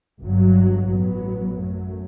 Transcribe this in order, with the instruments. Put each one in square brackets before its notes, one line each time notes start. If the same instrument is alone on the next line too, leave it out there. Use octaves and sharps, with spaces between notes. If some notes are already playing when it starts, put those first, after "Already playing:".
[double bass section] G1 G2 F#3
A1 A2 F#3 B3
F#2 F#3 A3